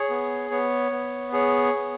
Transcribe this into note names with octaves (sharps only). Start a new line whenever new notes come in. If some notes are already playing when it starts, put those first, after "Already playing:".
Already playing: G#4 C#5
B3
B3 C#5
B3
G#4 C#5
B3